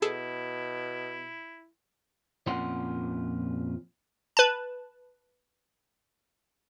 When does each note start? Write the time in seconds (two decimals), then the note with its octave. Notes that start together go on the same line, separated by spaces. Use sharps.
0.02 B2 E4 G#4 A4 A5
2.47 F2 A#2 C#4 F4 F#5 C6
4.37 B4 A5